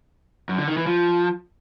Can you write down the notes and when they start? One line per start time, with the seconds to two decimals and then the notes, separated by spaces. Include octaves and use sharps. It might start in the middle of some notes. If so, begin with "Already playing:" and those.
0.49 F#2
0.58 D3
0.68 D#3
0.77 E3
0.87 F3